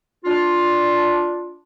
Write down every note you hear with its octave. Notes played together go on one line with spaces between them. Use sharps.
D4 F4